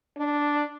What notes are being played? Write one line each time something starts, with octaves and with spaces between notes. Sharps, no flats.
D4